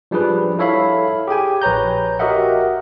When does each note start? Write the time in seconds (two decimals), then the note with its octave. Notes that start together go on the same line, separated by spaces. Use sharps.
0.11 F3 G3 D4 G#4 B4
0.59 E4 A4 C#5 E5 F5 B5
1.28 G4 G#4 G5 G#5
1.62 A#1 B4 C#5 A#5 G6
2.19 F#4 G4 A#4 D#5 E5 F#5